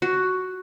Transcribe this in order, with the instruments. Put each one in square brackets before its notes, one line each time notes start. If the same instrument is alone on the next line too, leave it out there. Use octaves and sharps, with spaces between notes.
[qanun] F#4